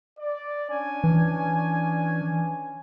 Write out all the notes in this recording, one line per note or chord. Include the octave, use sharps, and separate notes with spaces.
D5
C#4 D4 G#5
E3